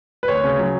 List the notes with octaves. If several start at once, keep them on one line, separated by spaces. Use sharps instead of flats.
B4
D2 C#5
C#3
F#3